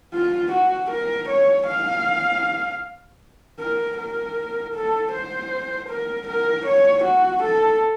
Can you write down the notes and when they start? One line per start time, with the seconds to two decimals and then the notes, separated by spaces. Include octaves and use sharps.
0.14 F4
0.53 F#4
0.92 A#4
1.30 C#5
1.68 F5
3.60 A#4
3.98 A#4
4.75 A4
5.13 C5
5.89 A#4
6.28 A#4
6.66 C#5
7.05 F#4
7.43 A4